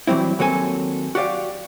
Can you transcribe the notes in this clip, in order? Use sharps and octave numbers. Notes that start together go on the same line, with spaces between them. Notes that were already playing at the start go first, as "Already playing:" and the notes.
E3 F#3 G3 C4 E4
D#2 F#3 C4 A4 G#5
F#4 G4 D5 F5